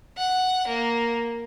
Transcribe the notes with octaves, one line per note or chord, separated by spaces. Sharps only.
F#5
A#3